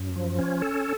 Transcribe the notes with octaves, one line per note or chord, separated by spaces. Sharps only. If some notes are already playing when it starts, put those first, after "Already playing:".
Already playing: F#2
F3
C#4
A4